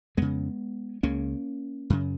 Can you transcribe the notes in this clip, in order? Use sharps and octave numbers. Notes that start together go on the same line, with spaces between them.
F2 C#3 G#3 B3
C#2 C#3 A#3 C#4
F#2 C#3